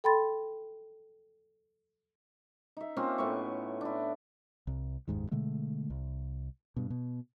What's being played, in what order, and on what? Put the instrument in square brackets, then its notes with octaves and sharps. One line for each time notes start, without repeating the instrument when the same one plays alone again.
[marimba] A4 G5 B5 C6 A6
[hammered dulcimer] D#4 E5
A#3 C4 C#4 F4
A2 B3 C#6
D4 E4
[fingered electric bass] C2
F#1 D#2 G#2 D#3
B2 D3 G#3 A3
C2
G2 B2
B2